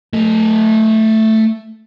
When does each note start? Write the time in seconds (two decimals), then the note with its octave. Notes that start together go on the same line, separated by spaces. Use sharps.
0.13 A3 D#5